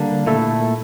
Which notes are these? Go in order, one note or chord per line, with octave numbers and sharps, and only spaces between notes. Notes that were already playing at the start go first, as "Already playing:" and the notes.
Already playing: D3 G3 A#3 D4
A#2 A3 E4 A4